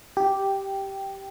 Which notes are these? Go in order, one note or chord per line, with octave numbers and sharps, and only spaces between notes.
G4